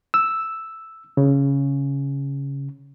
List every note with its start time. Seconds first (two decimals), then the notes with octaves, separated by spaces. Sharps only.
0.14 E6
1.17 C#3